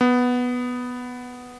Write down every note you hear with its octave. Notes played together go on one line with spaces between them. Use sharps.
B3